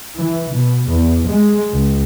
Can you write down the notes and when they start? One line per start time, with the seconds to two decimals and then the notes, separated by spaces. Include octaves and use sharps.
0.17 E3
0.53 B2
0.90 E2
1.27 G#3
1.74 C#2